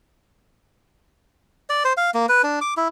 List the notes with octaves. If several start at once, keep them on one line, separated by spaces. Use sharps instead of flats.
D5
C5
F5
A#3
B4
D4
D6
E4